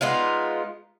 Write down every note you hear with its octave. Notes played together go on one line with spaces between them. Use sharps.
G#3 B3 D#4 F4